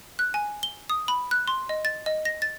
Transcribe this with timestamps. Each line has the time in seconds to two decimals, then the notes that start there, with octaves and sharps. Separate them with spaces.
0.19 F#6
0.34 G#5
0.63 G7
0.90 D#6
1.08 B5
1.31 F#6
1.48 C6
1.69 D#5
1.85 A6
2.06 D#5
2.25 A#6
2.42 A6